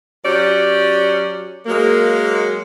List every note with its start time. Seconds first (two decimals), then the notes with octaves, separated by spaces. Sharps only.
0.24 F#3 C#4 G4 D5
1.66 F#3 G#3 A#3